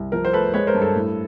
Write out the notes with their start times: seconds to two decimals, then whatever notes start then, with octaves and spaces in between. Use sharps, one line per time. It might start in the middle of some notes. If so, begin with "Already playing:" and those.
Already playing: C2
0.12 F3 A#4
0.25 C5
0.33 A3 A4 B4
0.54 G#3 B4 C#5
0.67 A#4 C5
0.74 G2
0.82 A4
0.95 A2